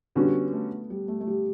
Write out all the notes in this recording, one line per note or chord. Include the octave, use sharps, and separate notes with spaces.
D3 G3 B3 C#4 F#4
A3
G3
A3
A3
G3